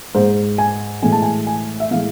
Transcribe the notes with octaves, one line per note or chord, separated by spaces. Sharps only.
G#2 G#3 C5
G#5
A2 E3 G#3 G#5
A5
G#5
G#5
E5
A2 E3 G#3 F5